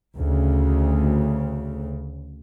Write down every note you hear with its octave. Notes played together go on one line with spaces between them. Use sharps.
D2 C#3